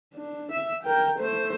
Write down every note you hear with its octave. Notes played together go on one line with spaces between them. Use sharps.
D4
E5
A#4 G5
A3 C5